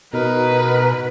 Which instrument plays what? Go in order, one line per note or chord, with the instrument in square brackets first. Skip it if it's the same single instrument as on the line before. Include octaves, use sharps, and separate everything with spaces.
[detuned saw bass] B2 [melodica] D#4 A#4 [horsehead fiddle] B4